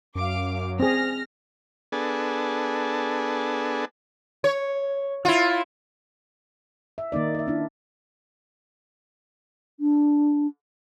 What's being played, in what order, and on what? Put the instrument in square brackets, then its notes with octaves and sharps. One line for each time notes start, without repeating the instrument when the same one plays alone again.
[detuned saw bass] F#2 [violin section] F5 D6
[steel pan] C4 G#4 [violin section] F6 A#6
[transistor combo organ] B3 D4 G#4 A4
[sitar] C#5
E4 F4
[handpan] E5
D#3 A#3 D#4 D5
A#4 E5
C#4 D4 E4
[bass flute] D4